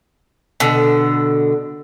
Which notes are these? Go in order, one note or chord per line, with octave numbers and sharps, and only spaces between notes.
B2 D3